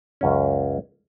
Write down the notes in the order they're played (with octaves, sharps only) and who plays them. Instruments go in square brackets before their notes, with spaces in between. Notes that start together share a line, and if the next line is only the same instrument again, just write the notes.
[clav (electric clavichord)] C#2 F#2 C#4